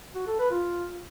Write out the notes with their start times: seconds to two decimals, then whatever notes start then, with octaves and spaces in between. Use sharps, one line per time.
0.15 F#4
0.27 A4
0.39 B4
0.51 F4